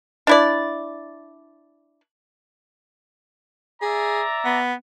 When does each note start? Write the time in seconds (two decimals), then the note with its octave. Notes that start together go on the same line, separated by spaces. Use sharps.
0.27 D4 E4 D5
3.82 G#4 D5 E5 A#5
4.45 B3